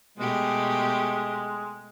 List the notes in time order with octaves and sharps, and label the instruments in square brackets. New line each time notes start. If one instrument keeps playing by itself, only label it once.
[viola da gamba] B2 A3 G4 [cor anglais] G#3